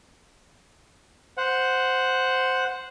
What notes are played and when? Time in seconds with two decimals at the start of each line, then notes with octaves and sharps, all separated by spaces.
1.37 C5 F#5